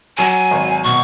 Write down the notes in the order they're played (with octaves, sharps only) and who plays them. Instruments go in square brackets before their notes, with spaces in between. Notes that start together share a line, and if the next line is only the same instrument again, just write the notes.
[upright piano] F#3 [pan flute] G#5
[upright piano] G#1
[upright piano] B2 [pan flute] C#6